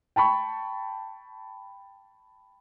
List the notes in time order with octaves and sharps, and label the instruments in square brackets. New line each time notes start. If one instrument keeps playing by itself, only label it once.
[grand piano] G5 A5 B5 C#6